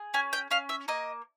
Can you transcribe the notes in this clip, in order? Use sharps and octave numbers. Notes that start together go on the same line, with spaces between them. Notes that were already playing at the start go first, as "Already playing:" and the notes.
Already playing: G#4
C#4 G#5
G5
C#4 F5
E5
A#3 D#5